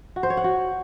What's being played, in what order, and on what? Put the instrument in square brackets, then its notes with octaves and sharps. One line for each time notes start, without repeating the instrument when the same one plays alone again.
[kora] F#4
C5
C#5
F#5
F#4